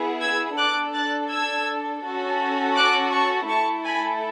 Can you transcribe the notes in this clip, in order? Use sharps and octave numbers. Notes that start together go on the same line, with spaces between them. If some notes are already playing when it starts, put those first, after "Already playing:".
Already playing: B3 E4 G#4
E6 G#6
D4 A4 D6 F#6
F#6 A6
E6 G#6
C#4 F#4 A4
D6 F#6
A5 C#6
A3 E4 A4 A5 C#6
G#5 B5